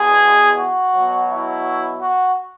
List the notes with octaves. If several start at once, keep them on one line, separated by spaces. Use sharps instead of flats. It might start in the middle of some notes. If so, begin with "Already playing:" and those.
Already playing: E2 B2 G#3 G#4
F#4
B2 F#3
E4
F#4